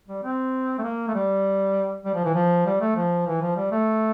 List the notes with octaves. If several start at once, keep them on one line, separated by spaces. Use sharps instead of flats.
G3
C4
A3
A#3
A3
G3
G3
F3
E3
F3
G3
A3
F3
E3
F3
G3
A3